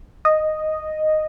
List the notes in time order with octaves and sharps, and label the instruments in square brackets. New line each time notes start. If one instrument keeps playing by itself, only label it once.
[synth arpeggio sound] D#5